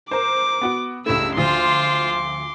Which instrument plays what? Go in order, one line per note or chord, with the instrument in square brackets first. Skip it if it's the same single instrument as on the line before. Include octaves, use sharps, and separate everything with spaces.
[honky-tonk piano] A#4 C5 [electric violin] D6
[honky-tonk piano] B3 F#4 D7
[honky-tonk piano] C#2 G2 A3 [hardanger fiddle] E4 [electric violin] E6
[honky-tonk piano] D2 F3 [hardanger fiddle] F4 C5 [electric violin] C6 D6